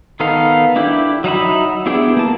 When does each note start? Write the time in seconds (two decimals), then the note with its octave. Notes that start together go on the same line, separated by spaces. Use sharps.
0.20 D#3 B3 D#4 A4 F5
0.76 D4 E4 G4
1.24 F#3 D#4 E5 B5
1.86 B3 D4 E4 G4 G#4
2.17 A#3 A5